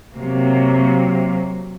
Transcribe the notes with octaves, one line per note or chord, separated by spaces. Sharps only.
C3 F#3 A#3